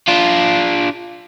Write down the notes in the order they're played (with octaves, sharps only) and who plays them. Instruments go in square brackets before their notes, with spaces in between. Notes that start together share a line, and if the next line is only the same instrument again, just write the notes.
[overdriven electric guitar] D4 F4